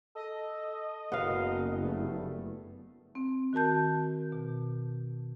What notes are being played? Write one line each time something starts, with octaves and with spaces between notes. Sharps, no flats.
A4 D#5
F#1 F#2 B3 F5
G2 A3
C4
D#3 F#4 A#4 A5 G6
B2